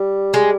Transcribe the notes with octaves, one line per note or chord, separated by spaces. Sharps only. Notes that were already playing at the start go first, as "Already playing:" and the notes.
Already playing: G3
G#3